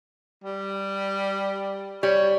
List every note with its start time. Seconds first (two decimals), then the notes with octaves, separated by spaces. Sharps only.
0.44 G3
2.03 G3 C#5